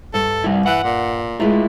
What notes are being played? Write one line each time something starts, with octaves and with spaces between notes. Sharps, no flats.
G2 A4
G3 E4
E3 F#5
A#2
G#3 A3 E4 F4